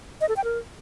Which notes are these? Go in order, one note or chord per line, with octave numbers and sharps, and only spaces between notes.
D#5
A4
G5
A#4